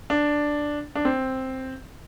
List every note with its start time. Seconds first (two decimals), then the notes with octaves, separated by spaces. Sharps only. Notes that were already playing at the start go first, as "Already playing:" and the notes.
0.10 D4
0.95 D4
1.05 C4